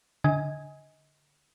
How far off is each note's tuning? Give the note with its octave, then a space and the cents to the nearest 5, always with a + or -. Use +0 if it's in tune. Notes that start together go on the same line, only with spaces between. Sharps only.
D3 -10 D#5 +30 G#5 +0